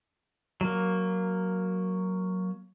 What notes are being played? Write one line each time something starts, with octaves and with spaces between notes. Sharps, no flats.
F#3 A#3